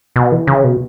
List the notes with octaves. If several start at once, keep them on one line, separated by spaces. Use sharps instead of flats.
B2
E3
C#3
B2